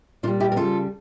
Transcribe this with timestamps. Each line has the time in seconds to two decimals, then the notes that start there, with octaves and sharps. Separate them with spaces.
0.23 A#2 D4 F4
0.28 G3
0.40 E4 G4
0.52 A#4
0.56 C#3 G3 F4 A4